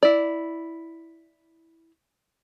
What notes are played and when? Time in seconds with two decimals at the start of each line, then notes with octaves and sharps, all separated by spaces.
0.03 E4 D5